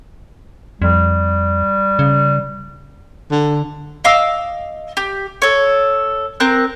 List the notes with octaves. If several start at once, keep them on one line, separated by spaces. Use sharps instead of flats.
F2 G3
C#3
D3
D#5 F5 D6 E6
G4
A4 C#5
C4 A#4 F#6